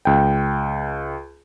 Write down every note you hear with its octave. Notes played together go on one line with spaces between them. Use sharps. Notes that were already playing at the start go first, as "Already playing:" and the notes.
C#2 G5